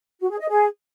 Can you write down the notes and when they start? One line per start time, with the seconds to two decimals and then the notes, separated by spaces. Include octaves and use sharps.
0.21 F#4
0.30 G#4
0.40 D#5
0.49 G#4